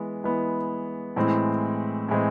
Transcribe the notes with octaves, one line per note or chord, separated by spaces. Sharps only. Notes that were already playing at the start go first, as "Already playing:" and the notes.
Already playing: E3 G#3 B3
E3 G#3 B3
A2 E3 G#3 C4
A2 E3 G#3 C4